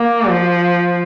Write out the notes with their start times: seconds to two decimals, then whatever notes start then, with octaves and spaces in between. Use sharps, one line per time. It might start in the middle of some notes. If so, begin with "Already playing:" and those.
Already playing: A#3
0.28 F3